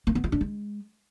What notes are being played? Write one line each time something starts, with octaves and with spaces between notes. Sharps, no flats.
A#3
B3
F4
D4
G#3